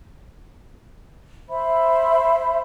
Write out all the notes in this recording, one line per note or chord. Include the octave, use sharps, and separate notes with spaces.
C5 E5 B5